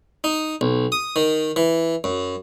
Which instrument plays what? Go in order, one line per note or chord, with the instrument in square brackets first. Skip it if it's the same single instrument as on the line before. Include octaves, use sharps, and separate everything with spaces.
[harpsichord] D#4
B1
D#6
D#3
E3
F#2